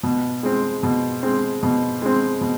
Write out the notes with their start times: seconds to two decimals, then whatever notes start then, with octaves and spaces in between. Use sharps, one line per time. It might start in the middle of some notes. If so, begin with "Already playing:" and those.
0.03 B2
0.43 G#3 C4
0.83 B2
1.23 G#3 C4
1.63 B2
2.02 G#3 C4
2.41 B2